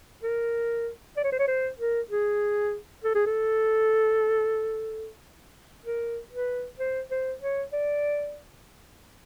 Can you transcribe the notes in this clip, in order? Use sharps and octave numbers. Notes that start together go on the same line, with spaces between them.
A#4
D5
C#5
C5
C#5
C5
A#4
G#4
A4
G#4
A4
A#4
B4
C5
C5
C#5
D5